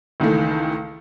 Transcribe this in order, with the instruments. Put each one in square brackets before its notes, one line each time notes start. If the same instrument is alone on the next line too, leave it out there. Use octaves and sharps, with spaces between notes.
[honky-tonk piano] C#2 D#3 E3 A3